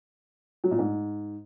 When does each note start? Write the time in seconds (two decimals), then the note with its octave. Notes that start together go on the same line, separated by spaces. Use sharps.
0.64 F#3
0.71 A#2
0.79 G#2